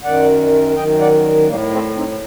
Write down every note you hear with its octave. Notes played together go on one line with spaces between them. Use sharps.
F#2 D#3 D5 F#5
F#2 D#3 D#5 G5
D5 F#5
A2 G3 A#3
A3 C4
C4 D#4